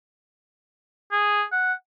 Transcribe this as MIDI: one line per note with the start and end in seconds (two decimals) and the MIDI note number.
1.12 1.44 68
1.52 1.73 78